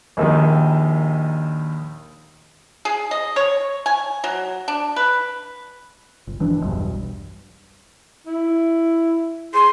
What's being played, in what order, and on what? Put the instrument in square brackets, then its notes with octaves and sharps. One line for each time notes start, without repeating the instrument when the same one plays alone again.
[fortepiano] A#1 D#2 D#3
[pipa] G#4
D#5
C#5
G#5
F#3
D4
B4
[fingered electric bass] G1
G1 E3 F3 D4
E1 B1 G2
[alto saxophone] E4
[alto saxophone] G#4 [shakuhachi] C6